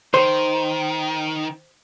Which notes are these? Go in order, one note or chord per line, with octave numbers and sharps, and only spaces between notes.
D#3 C5